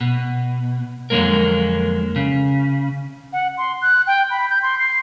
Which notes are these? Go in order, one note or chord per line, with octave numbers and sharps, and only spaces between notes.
B2
F2 D3 F#3 G#3 A#3 A#4
C#3
F#5
C6
F#6
G5
B5
G6
C6
C7